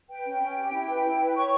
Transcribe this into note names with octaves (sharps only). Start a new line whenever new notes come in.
B4 G5
C#4
C#4
G4
E4
B4
E4
B4
C#5 C#6